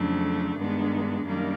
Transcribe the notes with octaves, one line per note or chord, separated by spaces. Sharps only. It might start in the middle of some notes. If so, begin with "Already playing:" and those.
Already playing: F2 C#3 F#3 A3 D4
G2 D#3 G#3 B3 D4
F#2 D#3 G3 A#3 D4